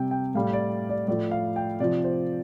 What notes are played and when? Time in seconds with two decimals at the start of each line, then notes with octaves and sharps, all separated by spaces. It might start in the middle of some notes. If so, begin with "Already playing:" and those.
Already playing: C3 G3 G5
0.11 G5
0.35 A2 G3 F5
0.53 D5
0.89 D5
1.08 A2 F3 D5
1.31 F5
1.56 G5
1.80 C3 F3 D5
2.04 C5